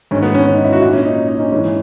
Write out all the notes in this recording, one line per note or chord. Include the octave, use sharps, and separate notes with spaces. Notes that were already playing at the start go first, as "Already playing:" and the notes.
G#2 D#3 C#4
B3
C#4
C#4
D#4
E4
F#4
A#2 E4
C#4
D#4
D#4
C#4
G#2 E3 C#4